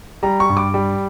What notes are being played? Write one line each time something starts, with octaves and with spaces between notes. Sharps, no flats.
G3 A#5
C#6
G2
D6
G3